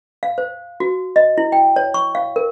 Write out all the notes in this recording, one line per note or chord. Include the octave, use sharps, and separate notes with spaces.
F5
C5
F#4
D#5
E4
G5
C#5
C#6
F5
A#4